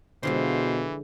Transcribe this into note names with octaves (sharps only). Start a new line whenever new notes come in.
B2 D3 E3 F3 G#3 F4 C5 F5